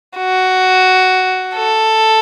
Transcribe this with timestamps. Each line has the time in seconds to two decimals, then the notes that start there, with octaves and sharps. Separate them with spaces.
0.18 F#4
1.57 A4